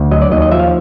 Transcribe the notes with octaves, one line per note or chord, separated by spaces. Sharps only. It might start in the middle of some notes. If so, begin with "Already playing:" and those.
Already playing: D2
F#3 D#5
D5
D#2 D#5
D#5
F3 E5
F5